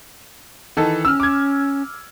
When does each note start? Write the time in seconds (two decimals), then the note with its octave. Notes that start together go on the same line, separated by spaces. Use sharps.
0.77 D#3 E3 A4
1.05 C#4 E6 F6
1.20 D6 G#6